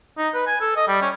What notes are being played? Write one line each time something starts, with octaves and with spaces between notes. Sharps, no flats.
D#4
B4
G#5
A4
D#5
G3
C#4